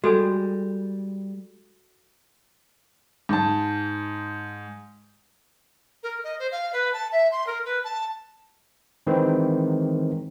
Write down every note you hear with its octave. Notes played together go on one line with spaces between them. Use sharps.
G3 G#3 F#4 A4 G#5
G#2 A5
A#4
D#5
C5
F5
B4
A5
E5
C6
A#4
B4
A5
D#3 E3 G#3 C4